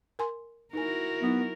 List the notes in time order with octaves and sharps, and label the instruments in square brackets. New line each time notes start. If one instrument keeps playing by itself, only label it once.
[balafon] A#4 G#5 C6
[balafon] D#4 G#5 [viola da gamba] E4 F#4 A#4
[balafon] F#3 D#4 [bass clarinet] B3